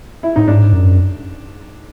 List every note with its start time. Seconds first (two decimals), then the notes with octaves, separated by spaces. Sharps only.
0.23 E4
0.36 A2 D#4
0.48 G#2 D4
0.73 F#2